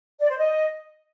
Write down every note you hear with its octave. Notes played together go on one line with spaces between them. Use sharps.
D5
C5
D#5